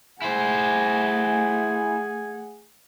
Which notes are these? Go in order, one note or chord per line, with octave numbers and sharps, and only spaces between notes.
A3 E4 G#4 C5 F#5 G#5